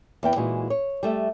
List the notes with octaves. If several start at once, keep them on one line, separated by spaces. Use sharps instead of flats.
E2 B3 G5
A#2 E3 G#3 D#4 F#4
C#5
G3 A3 E5